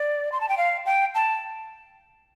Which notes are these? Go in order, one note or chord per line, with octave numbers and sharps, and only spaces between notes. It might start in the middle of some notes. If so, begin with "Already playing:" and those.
Already playing: D5
C6
A5
G5
F5
G5
A5